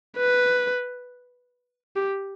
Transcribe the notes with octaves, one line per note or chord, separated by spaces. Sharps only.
B4
G4